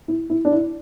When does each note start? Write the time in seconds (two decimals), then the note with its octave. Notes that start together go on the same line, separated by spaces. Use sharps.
0.08 E4
0.30 E4
0.45 D4
0.52 E4